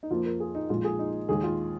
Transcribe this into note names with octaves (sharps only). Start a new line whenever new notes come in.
D#4
F2 F3 A#3 F4
A#4
G#4
D#4
A#1 A#2 G#3 F4
G#4
D#4
D#2 D#3 G#3 G#4
F4